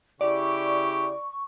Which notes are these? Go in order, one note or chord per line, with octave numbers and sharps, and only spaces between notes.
C#3 E4 G4 D5 C#6